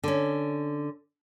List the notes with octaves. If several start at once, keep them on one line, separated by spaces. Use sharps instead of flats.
D3 C#4